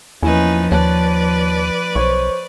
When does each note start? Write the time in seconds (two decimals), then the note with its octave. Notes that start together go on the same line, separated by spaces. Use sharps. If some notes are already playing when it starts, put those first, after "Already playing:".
0.23 E2 F3 A#3 C#4 D#4 E4 B4 G#5
0.72 D#2 B4 C#5 D5 A5 F#6
1.95 B1 C5 C#5 C#6